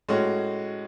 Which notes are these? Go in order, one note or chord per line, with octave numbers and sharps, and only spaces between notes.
A2 G#3 C#4 F#4